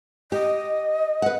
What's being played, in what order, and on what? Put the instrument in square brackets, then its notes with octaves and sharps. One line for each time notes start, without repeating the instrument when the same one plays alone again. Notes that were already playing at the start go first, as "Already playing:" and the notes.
[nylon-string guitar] G4 [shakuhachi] D#5
[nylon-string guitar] B4 F#5